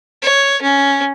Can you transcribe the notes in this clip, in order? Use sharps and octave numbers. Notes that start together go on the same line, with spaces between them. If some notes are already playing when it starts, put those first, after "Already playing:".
C#5
C#4